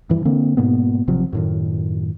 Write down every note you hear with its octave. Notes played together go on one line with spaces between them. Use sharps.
G2 E3
D3 A#3 C4
G#2 B2 A#3 B3
G#1 C3 F3 F#3
F#2 A2 D#3